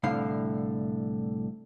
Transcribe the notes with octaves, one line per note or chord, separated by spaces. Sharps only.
C2 A2 D3 F5